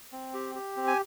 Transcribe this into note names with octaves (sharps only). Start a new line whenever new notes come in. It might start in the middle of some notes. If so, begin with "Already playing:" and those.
C4
G4
G4
C4
G#5